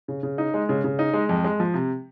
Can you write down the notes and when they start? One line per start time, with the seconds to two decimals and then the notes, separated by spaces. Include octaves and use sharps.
0.08 C#3
0.23 C#3
0.38 D#4
0.54 G#3
0.69 C#3
0.84 C#3
0.99 D#4
1.13 G#3
1.29 F2
1.44 G#3
1.60 F3
1.74 C3